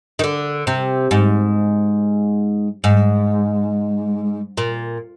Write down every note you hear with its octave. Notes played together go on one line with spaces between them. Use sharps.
D#3
D3
C3
G#2
G#2
A#2